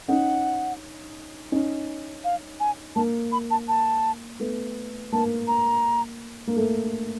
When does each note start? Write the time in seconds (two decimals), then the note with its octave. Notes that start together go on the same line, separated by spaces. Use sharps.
0.08 C#4 D#4 F#5
1.52 C#4 D#4
2.24 F5
2.60 G#5
2.96 A#3 A5
3.32 B5
3.51 A5
3.68 A5
4.40 A3 B3
5.12 A#3 A5
5.47 A#5
6.47 A#3
6.56 A3